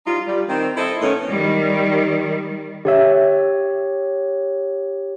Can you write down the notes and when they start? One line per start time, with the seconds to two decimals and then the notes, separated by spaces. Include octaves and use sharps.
0.07 G3 D#4 F4
0.27 G3
0.49 D#3 C4
0.77 E4 A4 C5 D#5 E5
1.01 A2 D#3 A3 B3 C#4
1.30 D#3 G3
2.85 D3 G4 C#5 E5